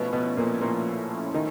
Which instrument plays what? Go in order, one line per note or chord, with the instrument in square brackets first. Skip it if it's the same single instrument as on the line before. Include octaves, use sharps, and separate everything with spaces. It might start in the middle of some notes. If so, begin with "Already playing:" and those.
Already playing: [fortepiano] B2 B3 [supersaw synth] F3 A3 C#4 E4
[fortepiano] B2 B3
A#2 A#3
A#2 A#3
D#3 D#4